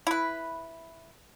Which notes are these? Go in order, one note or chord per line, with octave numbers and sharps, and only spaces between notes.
E4 B4